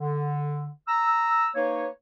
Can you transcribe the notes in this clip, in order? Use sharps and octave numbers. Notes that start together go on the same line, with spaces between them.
D3
A#5 E6
A#3 D#4 B4 C#5